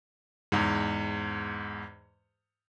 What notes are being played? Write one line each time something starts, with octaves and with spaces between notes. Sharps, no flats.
E2 G#2